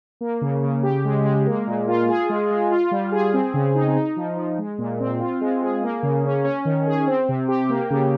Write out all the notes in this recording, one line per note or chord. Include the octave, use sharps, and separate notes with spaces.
A#3
C#3
C#3
G4
G#3
G#3
A#3
A#2
F4
G#4
G#3
G#3
F4
G3
G#4
C4
C#3
D#4
D#4
F3
F3
G#3
A#2
C4
F4
G#3
G#4
A#3
C#3
C#4
C#4
D#3
G#4
C4
C3
G4
A#3
C#3